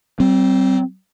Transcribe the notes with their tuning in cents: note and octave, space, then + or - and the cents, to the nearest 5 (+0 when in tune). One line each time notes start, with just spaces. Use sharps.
G3 -40 C4 +0